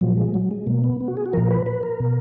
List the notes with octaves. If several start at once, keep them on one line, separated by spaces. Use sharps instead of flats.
A#2 F3 F#3
G#3
F#3
G#3
B2 A#3
B3
B3
F#4
G#4
F#4
A#2 F3 A#4
B4
B4
A#4
B2